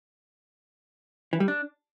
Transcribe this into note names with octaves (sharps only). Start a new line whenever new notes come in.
E3
G3
D4